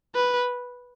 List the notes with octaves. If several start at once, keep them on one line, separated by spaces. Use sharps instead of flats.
B4